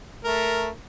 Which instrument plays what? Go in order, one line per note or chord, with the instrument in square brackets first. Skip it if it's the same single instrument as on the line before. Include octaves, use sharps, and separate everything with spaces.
[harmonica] A3 A#4